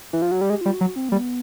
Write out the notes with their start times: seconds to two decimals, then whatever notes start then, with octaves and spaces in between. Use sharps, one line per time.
0.13 E3
0.22 F3
0.31 F#3
0.41 G3
0.50 G#3 G4
0.61 G3 F4
0.74 F#4
0.81 F#3
0.96 C4
1.09 G3 A#3
1.20 B3